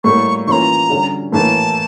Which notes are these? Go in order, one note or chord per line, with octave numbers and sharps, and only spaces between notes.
A2 G3 A#3 C#6
E3 A#3 C#4 F4 A#5 C#6
D3 G3 C#4
A2 E3 A#3 A5